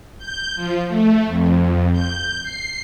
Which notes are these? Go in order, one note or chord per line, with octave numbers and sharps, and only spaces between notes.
G6
F3
A3
F2
G6
C7